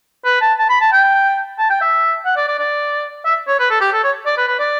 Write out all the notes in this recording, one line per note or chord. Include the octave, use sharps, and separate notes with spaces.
B4
A5
A5
B5
A5
G5
A5
G5
E5
F#5
D5
D5
D5
E5
C#5
B4
A4
G4
A4
C#5
D5
B4
B4
D5